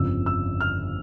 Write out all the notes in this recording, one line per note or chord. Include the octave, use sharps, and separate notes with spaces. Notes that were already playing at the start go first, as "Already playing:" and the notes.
Already playing: G1 F2 C#3 F3 E6
E6
F6